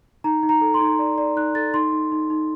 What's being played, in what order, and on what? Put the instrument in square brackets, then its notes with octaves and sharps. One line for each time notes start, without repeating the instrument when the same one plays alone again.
[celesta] D#4 A#5
D#4
A#5
A4
C6
D#4
D5
D5
D#4 F#6
A4 A6
D#4 C6
D#4
D#4
D#4